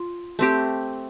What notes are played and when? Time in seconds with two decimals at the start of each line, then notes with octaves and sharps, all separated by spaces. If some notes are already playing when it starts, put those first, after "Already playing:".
Already playing: F4
0.39 A3 C4 G4